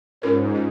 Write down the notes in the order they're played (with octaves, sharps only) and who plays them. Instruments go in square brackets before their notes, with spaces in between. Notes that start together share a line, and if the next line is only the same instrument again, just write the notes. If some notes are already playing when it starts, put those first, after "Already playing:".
[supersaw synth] G#2 [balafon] C#4 F4 A#4 C#5
[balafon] C#4 F4